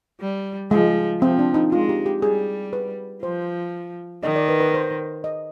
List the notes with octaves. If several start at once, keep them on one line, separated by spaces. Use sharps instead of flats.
G3
F3 G#3
F3 C4
D4
D#4
G#3 F4
G4
G4
G3 G#4
B4
F3 C5
D#3 D#5
D5
B4
B4
C5
D#5